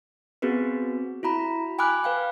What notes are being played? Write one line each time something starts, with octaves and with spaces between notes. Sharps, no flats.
B3 C4 F#4 G#4 B4
E4 F#4 A#5 B5
G5 G#5 B5 D6 F6 F#6
B4 F5 G5